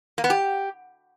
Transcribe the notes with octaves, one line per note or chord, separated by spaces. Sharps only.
A#3
B3
G4